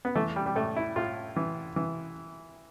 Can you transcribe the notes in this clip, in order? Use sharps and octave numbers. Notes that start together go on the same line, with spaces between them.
B3
E3 A3
G3
G3
A2 A3
E4
A2 F4
E3
E3